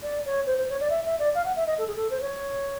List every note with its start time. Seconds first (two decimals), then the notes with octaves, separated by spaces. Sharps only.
0.03 D5
0.25 C#5
0.46 C5
0.58 C5
0.69 C#5
0.80 D5
0.90 E5
1.06 E5
1.19 D5
1.35 F5
1.45 F#5
1.56 E5
1.67 D#5
1.78 A4
1.87 G#4
1.96 A4
2.11 C5
2.21 C#5